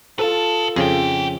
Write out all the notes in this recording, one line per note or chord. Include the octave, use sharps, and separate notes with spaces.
F4 A4 B4 A5
F2 C#3 G#4 G5